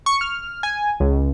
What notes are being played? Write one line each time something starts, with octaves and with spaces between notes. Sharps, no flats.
C#6
F6
G#5
C#2